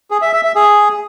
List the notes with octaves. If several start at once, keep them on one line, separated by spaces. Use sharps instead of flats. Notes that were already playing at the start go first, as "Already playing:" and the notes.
G#4
E5
E5
E5
G#4